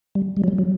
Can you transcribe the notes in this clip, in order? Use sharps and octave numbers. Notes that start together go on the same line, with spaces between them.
G3
G3
F#3
G3
F#3